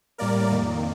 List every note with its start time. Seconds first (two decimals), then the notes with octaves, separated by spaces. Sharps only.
0.18 A2 G3 A#3 A#4 D5
0.51 F2 D#3 A#3